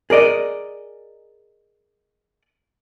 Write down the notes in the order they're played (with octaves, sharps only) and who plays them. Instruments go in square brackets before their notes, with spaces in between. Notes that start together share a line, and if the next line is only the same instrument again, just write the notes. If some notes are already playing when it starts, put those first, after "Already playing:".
[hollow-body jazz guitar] G#4 A#4 D5 D#5